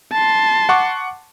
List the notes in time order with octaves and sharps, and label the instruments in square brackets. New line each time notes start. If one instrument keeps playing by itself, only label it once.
[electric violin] A5 C6
[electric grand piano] F#5 C#6 D6